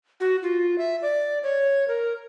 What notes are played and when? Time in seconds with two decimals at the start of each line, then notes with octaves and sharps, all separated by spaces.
0.20 F#4
0.43 F4
0.78 E5
1.02 D5
1.43 C#5
1.88 A#4